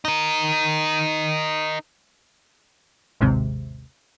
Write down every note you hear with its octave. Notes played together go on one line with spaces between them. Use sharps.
D#4 A#4
A1 D#2 G#2 C3